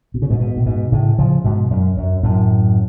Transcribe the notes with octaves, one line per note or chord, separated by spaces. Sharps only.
B2
C#3
G#2 B2
G#2 B2
A2
G#2 B2
A2 C#3
C#3 F3
G#2 B2
F#2
F#2
F#2 A2